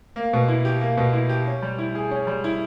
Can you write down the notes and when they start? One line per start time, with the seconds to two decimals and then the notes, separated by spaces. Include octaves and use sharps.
0.16 A#3
0.33 B2
0.48 E4
0.65 G4
0.81 A#3
0.97 B2
1.13 E4
1.29 G4
1.47 C#4
1.62 G3
1.79 E4
1.95 G#4
2.11 C#4
2.27 G3
2.44 E4